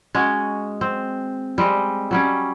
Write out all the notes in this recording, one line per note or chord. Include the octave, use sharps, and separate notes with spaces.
G#3 C#4 F#4
C4
G3 G#3 C4 D#5
F#3 G3 C#4